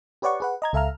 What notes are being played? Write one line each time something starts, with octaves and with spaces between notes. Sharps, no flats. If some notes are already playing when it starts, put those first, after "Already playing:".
G4 B4 C#5 D5 F#5 C#6
G#4 B4 F#5
D#5 A#5 G#6
C#2 A4 E5 F5 A#5 F6